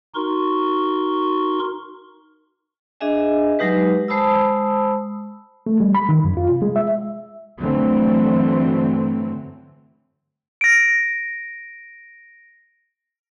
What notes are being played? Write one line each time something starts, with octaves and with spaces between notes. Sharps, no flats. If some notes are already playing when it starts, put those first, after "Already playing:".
D#4 F#4 A#4 C6 C#6
D4 G#4 D#5 E5 G#5
F#3 G#3 D#4 G4 B4
G#3 C5 A5 B5 D#6 E6
A3
G3
B5
D#3
F#2
F4
C3
G#3
E5
G2 D3 E3 F#3 A3 C4
A#6 D7